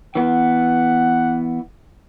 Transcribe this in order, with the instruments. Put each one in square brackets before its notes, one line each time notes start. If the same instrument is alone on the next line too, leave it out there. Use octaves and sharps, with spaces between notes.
[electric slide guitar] E3 B3 [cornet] F#5